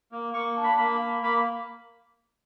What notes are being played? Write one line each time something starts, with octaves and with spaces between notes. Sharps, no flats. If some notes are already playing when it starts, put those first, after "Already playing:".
A#3
A#3 C#6
D4
B5
A#3 B5
A#3
A#3 B5